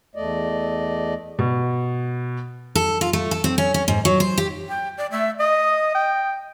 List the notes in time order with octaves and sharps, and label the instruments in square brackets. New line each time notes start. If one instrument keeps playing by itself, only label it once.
[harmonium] E2 A3 D5 D#5
[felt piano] B2
[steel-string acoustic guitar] A4
F4
A3
A4
C4
C#4
C#4
G#2
F#3
C5
G4
[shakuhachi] G5
D5
[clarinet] A3 [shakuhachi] E5
[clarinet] D#5 [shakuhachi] D#6
[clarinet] G5